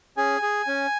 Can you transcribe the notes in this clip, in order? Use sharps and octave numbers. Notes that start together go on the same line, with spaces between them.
C#4 G#4 G#5
G#4
C#4